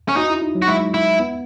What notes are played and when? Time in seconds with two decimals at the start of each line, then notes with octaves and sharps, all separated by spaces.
0.09 C#4
0.16 D#4 F#4
0.30 E4
0.42 D#4
0.55 F#3
0.62 F#4
0.68 G#3 E4
0.94 E4
1.20 B3